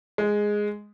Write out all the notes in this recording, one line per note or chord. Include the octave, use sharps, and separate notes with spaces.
G#3